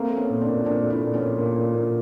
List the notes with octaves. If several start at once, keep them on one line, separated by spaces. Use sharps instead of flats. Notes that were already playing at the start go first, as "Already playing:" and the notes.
Already playing: A3 A#3 C4
A3
B3 C#4
A#2
C4 D4
A#2
A#2 C4 D4
A3
D4 E4
A#2
B3 C#4
A#2
A#2
A#2
A#2